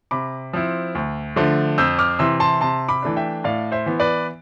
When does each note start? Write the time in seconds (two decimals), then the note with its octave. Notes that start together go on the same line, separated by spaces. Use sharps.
0.11 C3 B5 D6
0.53 F3 C4 E4
0.95 D2
1.36 D3 F3 A3
1.78 F2 E6 G6
1.99 D6 F6
2.19 C3 E3 C6 E6
2.40 A5 C6
2.61 C3 A5 C6
2.88 B5 D6
3.02 E3 A3 D4
3.17 E5 G5
3.44 A2 D5 F5
3.72 C5 E5
3.86 E3 B3
4.00 B4 D5